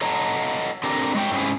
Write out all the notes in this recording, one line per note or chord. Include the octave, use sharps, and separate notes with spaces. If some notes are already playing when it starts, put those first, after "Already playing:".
A4 C#5 D#5 F#5 A5 A#5
C4 D4 G4 A4 A#4
G#3 C#5 G5
G#2 C4 C#4 E4 G#4